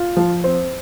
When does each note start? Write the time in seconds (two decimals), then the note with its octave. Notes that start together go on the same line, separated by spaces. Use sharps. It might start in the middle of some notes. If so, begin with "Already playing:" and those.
Already playing: F4
0.17 F3
0.44 C4